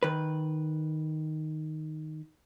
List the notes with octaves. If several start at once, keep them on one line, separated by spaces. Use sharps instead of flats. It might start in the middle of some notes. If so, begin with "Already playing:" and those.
D#3 B4